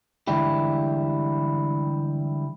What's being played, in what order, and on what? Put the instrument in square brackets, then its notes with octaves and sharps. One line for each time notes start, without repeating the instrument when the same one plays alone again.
[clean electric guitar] D3 E3 G3 G#3 E4 G4